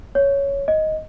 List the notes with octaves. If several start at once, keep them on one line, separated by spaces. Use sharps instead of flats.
C#5
D#5